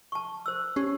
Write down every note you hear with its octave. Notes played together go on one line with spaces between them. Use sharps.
A5 C#6
C5 E6
C#4 G4